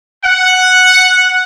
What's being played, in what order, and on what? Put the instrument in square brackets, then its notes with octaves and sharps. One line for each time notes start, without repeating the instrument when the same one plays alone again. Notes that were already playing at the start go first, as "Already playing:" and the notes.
[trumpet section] F#5